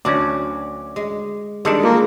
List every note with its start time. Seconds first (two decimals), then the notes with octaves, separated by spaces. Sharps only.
0.05 D2 F#3 C#4 D4 F#4 D6
0.96 G#3
1.65 D#3 G3 G#3 D4 A4
1.83 A#3 F4 G#4